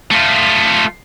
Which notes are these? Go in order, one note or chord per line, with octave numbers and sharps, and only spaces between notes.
A3 F4